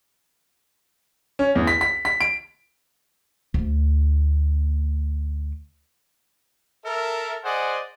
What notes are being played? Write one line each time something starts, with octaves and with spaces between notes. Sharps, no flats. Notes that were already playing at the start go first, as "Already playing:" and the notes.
C#4
E2
B6
B6
B6
D7
D2 A3
A4 A#4 E5
G#4 C5 D5 D#5 F#5 G#5